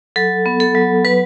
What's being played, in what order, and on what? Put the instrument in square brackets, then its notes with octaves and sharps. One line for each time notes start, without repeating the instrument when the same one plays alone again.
[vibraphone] F#3 A4
B3
A4
F#3
F#3 B4